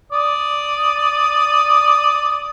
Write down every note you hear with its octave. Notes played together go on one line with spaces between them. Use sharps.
D5 D#6